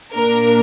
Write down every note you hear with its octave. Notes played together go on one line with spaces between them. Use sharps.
A#2 A#3 D4 A#4